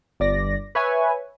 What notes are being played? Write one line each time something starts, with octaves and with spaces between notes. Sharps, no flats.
G1 D5 A#6
B4 C#5 E5 G#5